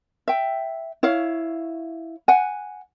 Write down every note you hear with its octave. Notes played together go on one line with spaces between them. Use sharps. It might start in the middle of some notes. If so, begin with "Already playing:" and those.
E5 G5
E4 C#5 F5
F#5 G#5